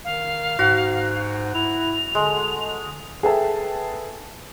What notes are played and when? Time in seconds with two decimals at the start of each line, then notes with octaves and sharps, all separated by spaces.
0.04 D#3 F5
0.59 G#2 F#4
1.54 E4 F7
2.15 D3 G#3
3.23 G#4 A4 B4 E5 G5 A5